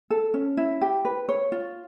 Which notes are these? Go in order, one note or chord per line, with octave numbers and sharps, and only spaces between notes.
A4
C#4
E4
G4
B4
C#5
F4